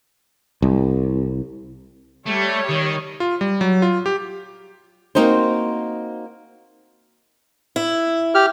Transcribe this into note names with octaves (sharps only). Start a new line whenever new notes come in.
C2
G3 A3 C#5
D#3
F4
G3
F#3
F4
G4
A#3 C4 D#4 F#4 C5
E4
G4 F6